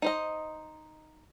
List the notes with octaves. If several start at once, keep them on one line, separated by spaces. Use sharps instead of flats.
D#4 C5 D#5